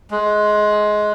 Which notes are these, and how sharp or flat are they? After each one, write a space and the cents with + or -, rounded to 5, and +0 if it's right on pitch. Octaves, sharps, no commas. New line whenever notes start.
G#3 +20